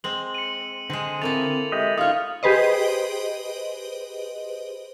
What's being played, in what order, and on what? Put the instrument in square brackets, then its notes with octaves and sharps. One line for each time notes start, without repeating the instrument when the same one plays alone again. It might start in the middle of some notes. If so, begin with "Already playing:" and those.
[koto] G#3 C4 [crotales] F#7
[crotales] C#7 D#7
[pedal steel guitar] D3 G#4 [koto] G#3 C4
[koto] A3 A#3 E4 [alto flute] C4 [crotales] A6 F7
[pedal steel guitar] G#3 G4 D#5 [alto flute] E5
[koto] C#3 C#5 [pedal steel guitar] D#4 F4 [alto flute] F5 [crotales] D#6 F6
[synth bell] G4 G#4 B4 C5 D#5